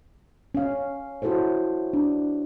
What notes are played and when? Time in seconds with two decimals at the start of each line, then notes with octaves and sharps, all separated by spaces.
0.55 C#4 F5
1.22 E4 F#4 A4 C5 C#5
1.93 D4